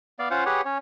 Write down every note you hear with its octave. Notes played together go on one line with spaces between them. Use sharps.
B3 D5 F5
C#4 F4 C5 F5 F#5
G4 G#4 B4 C#5 F#5
C#4 C#5